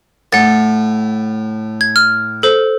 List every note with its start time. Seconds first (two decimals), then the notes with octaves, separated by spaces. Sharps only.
0.33 A2 F#5 A6
1.81 G#6
1.96 F6
2.43 A4 C5